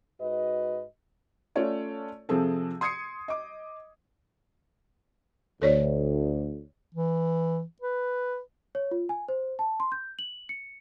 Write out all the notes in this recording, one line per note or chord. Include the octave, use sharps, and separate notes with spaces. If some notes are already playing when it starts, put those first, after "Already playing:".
G#2 F#4 B4 D#5
A3 C#4 F4 A4 C#5 D5
C3 F3 C4 G#4 A4
C6 D#6 G#6 C7 C#7
D#5 D6
D2 A4 C#5 D5
E3
B4
C#5
F4
G#5
C5
A5
C6
G6
F#7
C#7